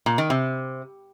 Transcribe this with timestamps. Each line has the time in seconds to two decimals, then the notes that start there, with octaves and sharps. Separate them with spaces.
0.06 A#2
0.18 D#3
0.30 C3